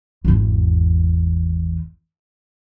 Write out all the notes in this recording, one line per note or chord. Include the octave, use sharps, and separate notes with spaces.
G#1 E2